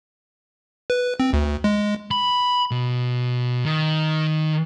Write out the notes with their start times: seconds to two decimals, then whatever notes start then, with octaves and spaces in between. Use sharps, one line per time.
0.90 B4
1.20 C4
1.33 D2
1.64 G#3
2.11 B5
2.71 B2
3.66 D#3